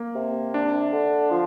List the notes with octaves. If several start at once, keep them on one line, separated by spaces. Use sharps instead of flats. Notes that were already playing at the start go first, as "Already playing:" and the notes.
Already playing: A#3
C3
D4
D3
F3